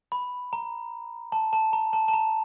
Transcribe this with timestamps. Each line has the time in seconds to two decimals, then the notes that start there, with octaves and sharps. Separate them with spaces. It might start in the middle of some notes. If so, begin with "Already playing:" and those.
0.12 B5
0.53 A#5
1.32 A5
1.53 A5
1.73 A#5
1.93 A5
2.08 A5
2.13 A#5